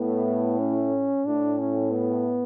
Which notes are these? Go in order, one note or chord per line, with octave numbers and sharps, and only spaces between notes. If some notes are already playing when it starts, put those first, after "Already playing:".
Already playing: A2 B3
C#4
A2 D4
C#4
B3